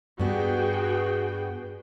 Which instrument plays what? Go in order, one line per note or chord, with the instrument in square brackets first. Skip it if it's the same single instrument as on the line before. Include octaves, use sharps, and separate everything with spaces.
[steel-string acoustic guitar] G2 B3 [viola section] F#4 G#4 G5